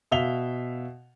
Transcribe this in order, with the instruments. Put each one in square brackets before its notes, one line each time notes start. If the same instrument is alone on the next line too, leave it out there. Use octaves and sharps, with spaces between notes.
[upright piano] B2 E5 F5 F7 G7